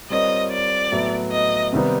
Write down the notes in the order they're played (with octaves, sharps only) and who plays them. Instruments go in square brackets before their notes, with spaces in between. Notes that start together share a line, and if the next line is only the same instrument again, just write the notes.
[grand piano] G3 C4 F4 A#4 C#5 [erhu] D#5
[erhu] D5
[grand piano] A2 F#3 B3 E4
[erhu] D#5
[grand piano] C3 D#3 G3 B3 D#4